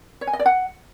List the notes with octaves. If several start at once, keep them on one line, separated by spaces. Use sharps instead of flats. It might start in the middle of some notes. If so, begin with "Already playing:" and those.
C#5
G#5
D#5
D5
F#5